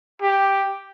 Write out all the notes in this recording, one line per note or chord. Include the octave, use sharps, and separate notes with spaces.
G4